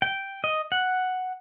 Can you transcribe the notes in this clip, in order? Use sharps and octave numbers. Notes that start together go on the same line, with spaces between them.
G5
D#5
F#5